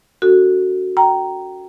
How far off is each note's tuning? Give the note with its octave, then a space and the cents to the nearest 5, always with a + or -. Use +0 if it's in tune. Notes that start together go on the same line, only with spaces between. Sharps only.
C#4 +30 F#4 +0 A4 +25
G5 -20 A#5 +0